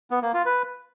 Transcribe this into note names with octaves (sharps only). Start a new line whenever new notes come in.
B3
A#3
F4
B4